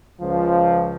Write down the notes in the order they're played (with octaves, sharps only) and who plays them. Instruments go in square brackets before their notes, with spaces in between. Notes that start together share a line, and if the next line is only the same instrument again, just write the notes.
[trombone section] C#2 F3